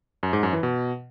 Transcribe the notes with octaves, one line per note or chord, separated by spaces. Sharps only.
F#2
G#2
F#2
E3
B2